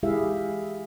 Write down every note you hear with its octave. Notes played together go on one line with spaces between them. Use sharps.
G#3 E4 G4 G#4 E5 F5